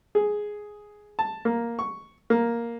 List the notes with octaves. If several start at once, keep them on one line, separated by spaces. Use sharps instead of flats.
G#4
A5
A#3
C#6
A#3